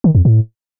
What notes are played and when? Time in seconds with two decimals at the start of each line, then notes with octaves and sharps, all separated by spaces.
0.04 D#3
0.15 F2
0.25 A2